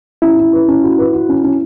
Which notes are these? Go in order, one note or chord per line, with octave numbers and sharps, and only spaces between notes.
C#4 E4
C#4
B4
C#4
F#4
B4
F#4
C#4
C#4